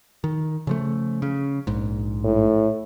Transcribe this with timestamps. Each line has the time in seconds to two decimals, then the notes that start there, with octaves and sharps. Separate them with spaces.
0.24 D#3
0.67 C#3 F3 A3
1.22 C#3
1.67 A#1 G#2
2.24 A2